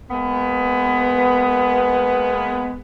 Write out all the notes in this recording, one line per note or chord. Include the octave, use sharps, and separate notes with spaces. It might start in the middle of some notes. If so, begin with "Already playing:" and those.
G#3 A#3 B3